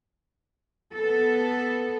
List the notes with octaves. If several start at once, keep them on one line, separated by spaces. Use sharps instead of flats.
B3 A4